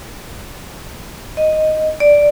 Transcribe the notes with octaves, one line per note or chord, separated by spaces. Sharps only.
D#5
D5